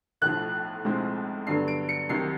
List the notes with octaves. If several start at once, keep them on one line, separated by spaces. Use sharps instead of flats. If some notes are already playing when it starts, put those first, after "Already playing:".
B1 A2 F3 F#6
B1 A2 F3 G#3 C4
G2 D3 F#3 B3 C7
D7
C#7
C2 C3 D#3 F#3 C7